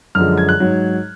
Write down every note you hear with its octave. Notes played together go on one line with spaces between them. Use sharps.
F#2 D3 F3 G#3 F6
G#6
F#6
G#2 F#3